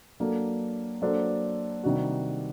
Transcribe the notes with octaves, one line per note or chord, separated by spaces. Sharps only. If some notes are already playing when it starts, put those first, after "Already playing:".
F#3 A#3 D4 A4
F#3 A#3 D4 A4 C5
C3 D#3 G3 D4 F#4